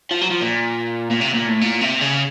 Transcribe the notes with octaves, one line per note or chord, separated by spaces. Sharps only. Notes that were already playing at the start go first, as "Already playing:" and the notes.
F3
F#3
F3
A#2
A#2
C3
A#2
A2
A#2
C3
C#3